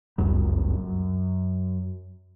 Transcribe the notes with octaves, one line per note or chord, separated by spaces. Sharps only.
G1 C#2 F#2 G3
F#2